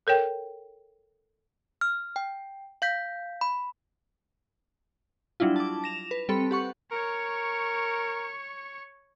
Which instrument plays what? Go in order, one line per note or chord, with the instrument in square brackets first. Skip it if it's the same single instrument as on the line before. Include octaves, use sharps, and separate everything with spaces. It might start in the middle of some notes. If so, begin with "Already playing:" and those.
[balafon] A4 A#4 C#5 G5
[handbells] F6
G5
F5 G6 B6
B5
[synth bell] F#3 G3 D4 E4 F4
A5 D6
A#6 E7 F7
B4
G3 C4 A4 B5 C#7
G4 F#5 C#6
[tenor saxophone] A#4 [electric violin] C#5 C#6